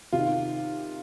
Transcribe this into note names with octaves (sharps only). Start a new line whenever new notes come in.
C3 D#3 F4